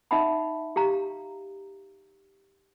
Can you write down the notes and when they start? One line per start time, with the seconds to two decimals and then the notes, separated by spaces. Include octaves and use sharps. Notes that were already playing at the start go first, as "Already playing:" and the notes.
0.11 D#4 D#5 E5 F#5 B5
0.76 G4 F5 A#5